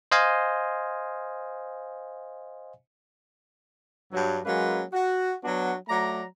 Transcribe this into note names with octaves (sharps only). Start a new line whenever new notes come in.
C5 D#5 F5 G#5
G2 F#3
F#3 G#3 A#3 C#4 B4
F#4
F#3 B3 D4 F#4
F#3 A3 D5 A#5